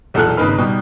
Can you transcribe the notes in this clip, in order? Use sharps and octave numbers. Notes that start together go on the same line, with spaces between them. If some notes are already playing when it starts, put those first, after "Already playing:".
B1 E2 A#2 A4 F6 F#6
G#1 C#3 A#3 D#4 B4 F6
B2 G3 D#4 G4